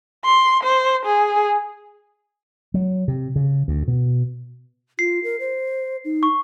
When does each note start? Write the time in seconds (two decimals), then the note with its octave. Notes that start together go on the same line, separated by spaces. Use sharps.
0.25 C6
0.64 C5
1.06 G#4
2.74 F#3
3.08 C3
3.36 C#3
3.68 D2
3.88 B2
4.99 F4 C7
5.24 A#4
5.40 C5
6.05 D#4
6.23 C#6